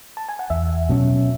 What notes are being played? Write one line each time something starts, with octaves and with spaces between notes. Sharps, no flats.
A5
G#5
F#5
E2 E5
B2 F#3 C#4